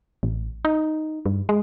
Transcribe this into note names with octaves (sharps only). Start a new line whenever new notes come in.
A1
D#4
G2
G#3